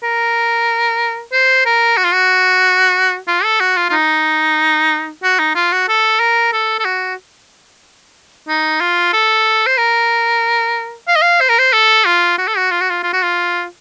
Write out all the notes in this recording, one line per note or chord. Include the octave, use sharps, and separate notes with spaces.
A#4
C5
A#4
F#4
F4
F#4
F4
A4
F#4
F4
F4
D#4
F#4
D#4
F4
F#4
A4
A#4
A4
A4
F#4
D#4
F4
A4
C5
A#4
F5
D#5
F5
C5
A#4
C5
A4
F4
F#4
A4
F#4
F4
F#4
F4
F4
F#4
F4